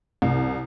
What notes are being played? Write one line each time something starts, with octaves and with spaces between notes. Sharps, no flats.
C2